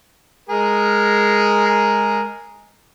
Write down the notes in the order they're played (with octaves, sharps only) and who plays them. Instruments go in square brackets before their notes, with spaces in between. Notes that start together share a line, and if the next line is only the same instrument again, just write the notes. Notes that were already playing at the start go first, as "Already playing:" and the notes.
[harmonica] G#3 G#4 A#4